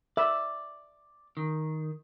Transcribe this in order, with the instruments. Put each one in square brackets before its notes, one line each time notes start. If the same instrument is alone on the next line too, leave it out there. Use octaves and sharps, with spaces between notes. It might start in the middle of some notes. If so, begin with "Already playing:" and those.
[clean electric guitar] D5 [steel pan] E5 B5 E6
[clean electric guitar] D#3